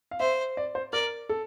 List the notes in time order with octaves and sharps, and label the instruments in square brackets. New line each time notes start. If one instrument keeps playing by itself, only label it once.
[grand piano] F5
[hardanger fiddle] C5 [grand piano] E5
[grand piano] D5
C5
[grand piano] A#4 [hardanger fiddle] D5
[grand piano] A4